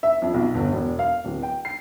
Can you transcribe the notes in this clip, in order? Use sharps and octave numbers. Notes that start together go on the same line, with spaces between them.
E5
F2
B1
G1
E1
F5
D1
G5
C7